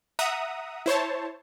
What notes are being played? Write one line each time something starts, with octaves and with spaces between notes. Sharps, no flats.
E5 F#5 A#5 D#6
E4 C5 C#5 A5